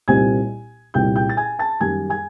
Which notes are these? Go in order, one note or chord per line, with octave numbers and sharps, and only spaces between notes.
C2 A#2 G3 C4 D#4 G#5 G#6
C2 A#2 G3 C4 D#4 G5 G6
G5 G6
A6
G#5 G#6
A5 A6
F#2 D#3 G3 A#3 G#5 G#6
G#5 G#6